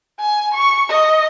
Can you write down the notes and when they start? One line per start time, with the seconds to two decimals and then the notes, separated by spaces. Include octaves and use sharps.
0.19 G#5
0.54 C#6
0.90 D#5